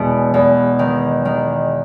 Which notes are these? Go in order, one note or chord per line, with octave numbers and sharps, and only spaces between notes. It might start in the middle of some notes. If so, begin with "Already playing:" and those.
Already playing: E2 B2 G#3
E2
D#3
D#3